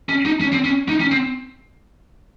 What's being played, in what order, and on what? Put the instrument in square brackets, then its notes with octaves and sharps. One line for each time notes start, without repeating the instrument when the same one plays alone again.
[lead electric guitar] C#4
D#4
C#4
C4
C#4
D#4
C#4
C4